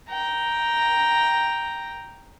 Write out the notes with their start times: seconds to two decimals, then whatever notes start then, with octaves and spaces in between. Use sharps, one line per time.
0.10 G5 A#5